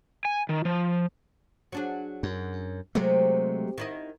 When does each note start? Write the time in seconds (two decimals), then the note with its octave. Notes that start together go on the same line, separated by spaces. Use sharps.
0.25 G#5
0.49 D#3
0.65 F3
1.72 F#3 D4 G#4
2.23 F#2
2.95 C3 F#3 G#3 A3
3.78 D#3 E4 D#5